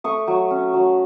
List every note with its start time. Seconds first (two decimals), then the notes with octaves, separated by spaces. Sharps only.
0.04 A3 C#6 D#6
0.27 F#3
0.51 C#4
0.74 F#3